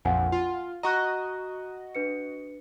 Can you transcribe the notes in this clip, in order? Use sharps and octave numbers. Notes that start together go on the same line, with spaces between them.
A#1 F2 F5 F#5 G#5
F4
F#4 D#5 A#5 C#6 F#6
D4 B4 C#7